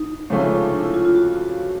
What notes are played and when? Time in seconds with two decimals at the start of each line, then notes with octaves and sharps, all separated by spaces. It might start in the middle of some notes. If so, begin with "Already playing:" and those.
Already playing: D#4
0.30 C#2 C3 F3 A3 C#4
0.73 D4
0.83 E4
0.94 F4
1.05 F4
1.15 F#4